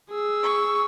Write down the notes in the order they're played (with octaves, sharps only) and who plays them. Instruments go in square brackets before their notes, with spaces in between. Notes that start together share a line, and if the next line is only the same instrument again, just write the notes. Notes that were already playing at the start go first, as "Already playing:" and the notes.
[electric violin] G#4 E6
[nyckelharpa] C#6